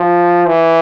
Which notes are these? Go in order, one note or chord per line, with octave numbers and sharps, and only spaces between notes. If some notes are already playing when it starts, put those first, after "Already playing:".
Already playing: F3
E3